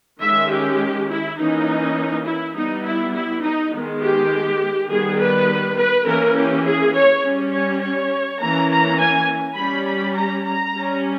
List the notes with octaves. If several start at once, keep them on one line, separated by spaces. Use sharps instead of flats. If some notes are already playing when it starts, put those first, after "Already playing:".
D#3 G#3 C#4 E5
G4
E4
E3 A#3 C#4 D#4
E4
G3 B3 D#4
E4
E4
D#4
D#3 G#3 B3
G4
D#3 G3 B3 G#4
B4
B4
E3 A#3 C#4 A#4
G4
G#4
C#5
G3 C#4
C#5
C#5
E3 A#3 C#4 A#5
A#5
G#5
G3 C#4 B5
B5
A#5
A#5
G3 C#4